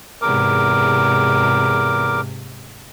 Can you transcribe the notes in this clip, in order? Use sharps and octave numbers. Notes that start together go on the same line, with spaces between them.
E2 G#2 C3 A#4 D6